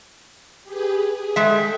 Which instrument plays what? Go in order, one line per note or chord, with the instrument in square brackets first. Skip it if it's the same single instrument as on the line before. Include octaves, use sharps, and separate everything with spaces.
[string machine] G4 G#4 B4
G#4
[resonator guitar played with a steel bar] G#3 E5 [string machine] A4 G5